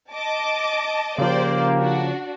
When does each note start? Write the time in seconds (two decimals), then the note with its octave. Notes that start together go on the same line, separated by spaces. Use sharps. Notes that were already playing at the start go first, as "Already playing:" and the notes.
0.12 D#5 A5 D6
1.18 C#3 F3 A#3 G4 C5 D5
1.78 D4 F#4